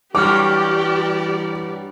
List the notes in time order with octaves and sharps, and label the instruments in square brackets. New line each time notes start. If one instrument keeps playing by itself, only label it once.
[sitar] G2 F#3 G3 [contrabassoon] E3 [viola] G4 D5 [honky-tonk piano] D6 F6